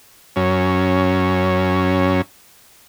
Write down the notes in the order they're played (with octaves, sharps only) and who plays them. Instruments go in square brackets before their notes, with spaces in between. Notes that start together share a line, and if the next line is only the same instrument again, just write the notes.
[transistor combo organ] F#2 C#4